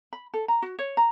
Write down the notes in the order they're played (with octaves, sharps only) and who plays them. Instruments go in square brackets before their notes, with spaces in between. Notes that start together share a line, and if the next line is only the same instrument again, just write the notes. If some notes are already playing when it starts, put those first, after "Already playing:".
[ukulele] B5
A4
A#5
F#4
C#5
A#5